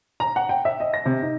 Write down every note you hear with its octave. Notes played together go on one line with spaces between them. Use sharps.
A#5
F#5
G5
E5
D#5
A#6
C3
D#4